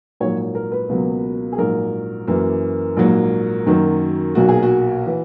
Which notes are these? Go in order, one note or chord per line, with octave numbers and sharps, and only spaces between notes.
A#1 G#2 F#3 A#3 C#5
A#4
B4
C#2 B2 F#3 A#3
G#4
A#1 G#2 F#3 A#4
F#2 E3 A#3
A#1 G#2 F#3 A#3
F#2 D#3 F#3 A#3
B1 A#2 F#3 A#3 F#4
G#4
F#4
E3